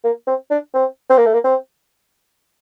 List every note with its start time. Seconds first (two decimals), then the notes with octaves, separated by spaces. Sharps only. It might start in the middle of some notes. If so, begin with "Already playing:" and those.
0.04 A#3
0.27 C4
0.51 D4
0.74 C4
1.10 C4
1.17 A#3
1.26 A3
1.33 A#3
1.44 C4